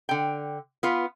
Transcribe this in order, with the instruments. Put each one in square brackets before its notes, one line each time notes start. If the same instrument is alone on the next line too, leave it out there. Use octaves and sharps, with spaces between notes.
[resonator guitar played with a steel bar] D3 G5
B3 F4 B4